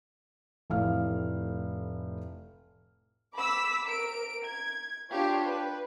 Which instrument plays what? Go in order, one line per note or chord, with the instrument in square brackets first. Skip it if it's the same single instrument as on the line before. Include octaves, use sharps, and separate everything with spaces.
[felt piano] F1 A2 F5 F6
[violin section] B5 D6 E6 B6
A#4 D7
G#6
D4 F4 G4 C#5
B4